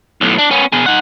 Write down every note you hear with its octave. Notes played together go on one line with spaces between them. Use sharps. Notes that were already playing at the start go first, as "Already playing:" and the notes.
B1 A2
D4
B3 C#4
B2 G#4
D#4 F#5